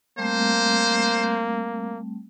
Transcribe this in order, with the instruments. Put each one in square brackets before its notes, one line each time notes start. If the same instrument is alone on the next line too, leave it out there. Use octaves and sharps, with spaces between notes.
[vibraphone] G3 A3 C4 [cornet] A#3 [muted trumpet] C5